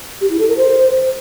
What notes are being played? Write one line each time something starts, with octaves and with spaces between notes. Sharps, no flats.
G4
E4
A4
A#4
C5